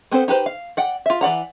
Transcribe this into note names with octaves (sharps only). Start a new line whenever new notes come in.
B3 C4 A4 C5
D#4 G4 B4 C5
F5
D5 F#5 G5
F4 E5
E3 D5 F#5 A#5